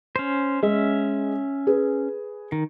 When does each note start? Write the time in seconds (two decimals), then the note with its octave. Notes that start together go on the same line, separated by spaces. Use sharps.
0.16 C#4 C5
0.63 G#3 C#4 E5
1.67 G#4 B4
2.52 D#3